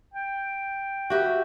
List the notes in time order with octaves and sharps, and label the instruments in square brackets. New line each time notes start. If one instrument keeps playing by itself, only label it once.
[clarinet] G5
[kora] F#4 G4 B4 [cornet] E5